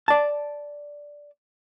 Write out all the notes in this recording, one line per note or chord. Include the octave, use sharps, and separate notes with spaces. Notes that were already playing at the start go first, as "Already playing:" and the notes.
D5 A5